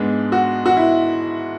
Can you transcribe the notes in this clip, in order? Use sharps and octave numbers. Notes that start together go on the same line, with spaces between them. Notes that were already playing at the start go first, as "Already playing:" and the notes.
Already playing: G#2 G#3 B3 D4
F#4
F#4
E4